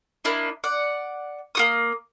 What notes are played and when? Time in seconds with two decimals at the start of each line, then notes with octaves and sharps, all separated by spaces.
0.24 A#3 D4 E4 D#5
0.64 D5 F#5
1.55 A#3 F#4 D#6